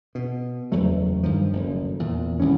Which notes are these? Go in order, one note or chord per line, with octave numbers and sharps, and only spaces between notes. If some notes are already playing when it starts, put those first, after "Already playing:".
B2
F#1 E2 F#3 A3
G2 D#3 F3
F#1 D2
E2 A#2
D#1 C2 E3 C#4